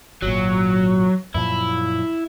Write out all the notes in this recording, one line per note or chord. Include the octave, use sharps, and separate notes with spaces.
G#1 A#2 F#3
F#2 A#2 F3 E4